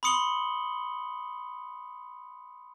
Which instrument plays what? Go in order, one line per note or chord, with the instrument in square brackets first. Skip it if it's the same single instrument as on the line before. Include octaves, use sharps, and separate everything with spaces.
[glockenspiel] B5 C6 D#6 C#7 F#7 G7